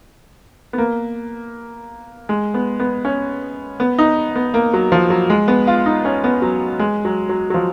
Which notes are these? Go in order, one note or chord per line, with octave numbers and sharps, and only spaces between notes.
B3
A#3
G#3
B3
B3
C#4
B3
D#4
B3
A#3
F#3
F3
F#3
G#3
B3
F4
D#4
C#4
B3
F#3
G#3
F#3
F#3
F#3
F3